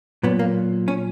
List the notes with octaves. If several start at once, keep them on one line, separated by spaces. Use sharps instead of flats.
A#2 F#3 B3
A#3
C#4